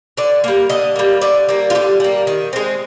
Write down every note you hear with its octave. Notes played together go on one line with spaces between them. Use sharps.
D3 D5
G3 A#3
D3 D#5
G3 A#3
D3 D5
G3 A#3
F4
D3 G4
G3 A#3
D#3
G#3 C4